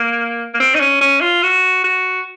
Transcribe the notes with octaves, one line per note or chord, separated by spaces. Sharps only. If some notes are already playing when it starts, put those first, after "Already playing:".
Already playing: A#3
A#3
C4
D#4
C#4
C#4
F4
F#4
F#4